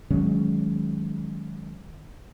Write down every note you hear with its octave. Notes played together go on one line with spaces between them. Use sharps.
D#3 F#3 G#3 C#4